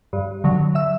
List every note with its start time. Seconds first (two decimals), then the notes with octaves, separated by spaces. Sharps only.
0.13 G2
0.44 D3 F#3
0.75 E5 E6